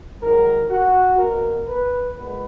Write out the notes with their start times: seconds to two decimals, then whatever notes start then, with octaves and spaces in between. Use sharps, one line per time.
0.22 G#2 D#3 F#3 A#4
0.70 F#4
1.18 B2 A#3 A#4
1.68 B4
2.16 A#2 G#3 B3 B4